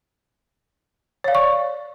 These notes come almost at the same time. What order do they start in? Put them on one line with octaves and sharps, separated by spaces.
C#5 F5 D5 C#6